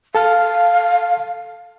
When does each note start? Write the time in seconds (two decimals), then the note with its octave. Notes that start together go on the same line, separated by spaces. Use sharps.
0.15 A4 F5 A5 F6